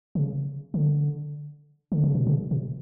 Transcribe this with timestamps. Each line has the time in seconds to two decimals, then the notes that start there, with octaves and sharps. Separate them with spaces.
0.15 C#3
0.74 D3
1.92 D3
2.04 C#3
2.15 B2
2.27 C#3
2.51 B2